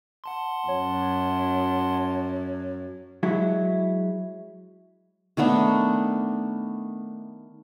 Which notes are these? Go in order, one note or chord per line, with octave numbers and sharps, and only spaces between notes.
F#5 A5 C6
F#2 C#5
F#3 G#3 E4
D#3 A3 B3 D4